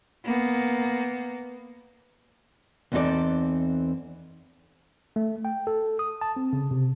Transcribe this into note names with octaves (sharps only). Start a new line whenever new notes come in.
A#3 B3
E2 E3 C4 D#4 A4 D5
A3
G5
A4
D#6
A5
C4
C#3
C3